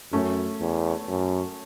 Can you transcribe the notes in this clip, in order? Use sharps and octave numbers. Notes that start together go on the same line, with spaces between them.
F#2 A3 C#4
E2
F#2